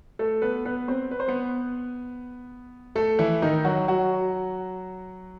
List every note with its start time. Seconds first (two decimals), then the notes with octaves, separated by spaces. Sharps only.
0.19 A3 A4
0.42 B3 B4
0.65 B3 B4
0.88 C4 C5
1.11 B4
1.20 C5
1.28 B3 B4
2.95 A3 A4
3.19 E3 E4
3.42 D#3 D#4
3.65 F#3 F#4
3.88 F#3 F#4